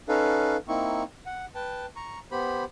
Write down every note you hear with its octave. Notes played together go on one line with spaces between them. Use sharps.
C#4 D#4 A4 B4 F5
A#3 C4 D#4 E4 C#6
F#5
B4 G5 A5
A#5 C#6
B3 G4 C5 B5